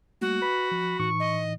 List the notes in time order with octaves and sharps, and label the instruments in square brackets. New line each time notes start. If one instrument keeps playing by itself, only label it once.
[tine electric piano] G3 A3 A#3 [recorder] F#4
[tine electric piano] B4 [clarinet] B5
[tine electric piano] F3
[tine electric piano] A2 E3 D#4 [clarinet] C#6
[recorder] D#5